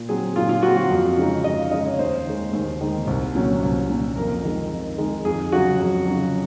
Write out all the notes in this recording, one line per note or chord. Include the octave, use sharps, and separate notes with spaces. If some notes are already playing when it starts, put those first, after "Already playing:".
Already playing: A#2
F#3 C4 G#4
A#2 F4
F4
F#3 C4 F#4
F#4
F2
C#3 G#3 D#4
F2 D#5
F5
C#3 G#3 D#4 D#5
C#5
D#2 C5
D#3 G#3
D#2
D#3 G#3
C2
A#2 F#3 C#4
C2
A#2 F#3 C#4
F2 A#4
D#3 G#3 D#4
F2
D#3 G#3 D#4
F2 G#4
C#3 F#3 F#4
F2
C#3 F#3